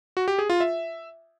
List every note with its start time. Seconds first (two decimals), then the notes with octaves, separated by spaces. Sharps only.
0.17 F#4
0.28 G4
0.39 G#4
0.50 F4
0.61 E5